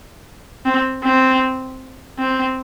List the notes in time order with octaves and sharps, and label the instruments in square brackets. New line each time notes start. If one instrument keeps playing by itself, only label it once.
[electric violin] C4
C4
C4